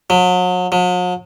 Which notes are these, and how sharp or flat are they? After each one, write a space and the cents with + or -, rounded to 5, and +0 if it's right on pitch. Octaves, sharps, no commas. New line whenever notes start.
F#3 -35
F#3 -45